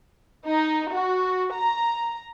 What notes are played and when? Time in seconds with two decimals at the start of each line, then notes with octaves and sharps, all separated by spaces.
0.49 D#4
0.93 F#4
1.54 A#5